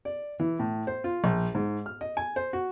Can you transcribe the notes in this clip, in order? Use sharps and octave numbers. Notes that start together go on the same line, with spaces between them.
D5
E3
A2
C5
F4
A#1
G#2
F6
D#5
G#5
C5
F#4